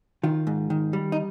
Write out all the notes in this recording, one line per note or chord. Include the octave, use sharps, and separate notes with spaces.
D#3 F4
G#2
D#3
G3
D#4